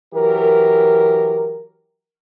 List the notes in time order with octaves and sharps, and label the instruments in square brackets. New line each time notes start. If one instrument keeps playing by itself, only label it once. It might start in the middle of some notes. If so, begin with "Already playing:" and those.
[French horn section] E3 F#3 G4 A#4